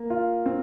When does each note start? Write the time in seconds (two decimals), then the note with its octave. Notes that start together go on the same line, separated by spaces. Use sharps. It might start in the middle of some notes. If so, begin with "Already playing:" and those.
Already playing: A#3
0.10 F4
0.46 C4